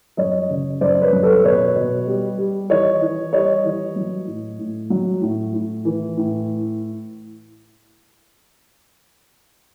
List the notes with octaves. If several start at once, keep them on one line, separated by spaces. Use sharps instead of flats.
F#2 C#5 D#5
C#3
F#2 C5 D5
B4 C#5
F#2
A4 B4
B2 B4 C#5
B2
G3
G3
E3 C#5 D#5
E3
G3 C#5 D#5
E3
F#3
A2
A2
F#3
A2
A2
E3
A2